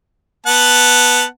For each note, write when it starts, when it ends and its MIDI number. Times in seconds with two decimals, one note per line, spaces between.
0.47 1.25 59
0.47 1.25 78
0.47 1.25 81